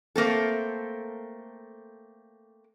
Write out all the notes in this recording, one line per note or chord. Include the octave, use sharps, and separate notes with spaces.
A3 A#3 C4 A4